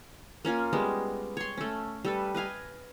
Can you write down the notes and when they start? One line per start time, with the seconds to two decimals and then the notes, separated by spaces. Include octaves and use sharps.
0.45 A#3 C#4 F4 G#5
0.73 G3 G#3 B3
1.37 C#5 C6
1.57 A3 C#4
2.05 G3 A4 B4
2.34 B4 D#5 F5 G#5